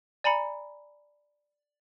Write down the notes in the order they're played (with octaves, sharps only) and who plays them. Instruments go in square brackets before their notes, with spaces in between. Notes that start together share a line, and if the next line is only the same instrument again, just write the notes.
[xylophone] D5 G#5 A#5 B5 C#7